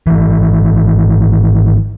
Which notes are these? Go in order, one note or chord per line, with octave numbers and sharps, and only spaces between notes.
G#1 E3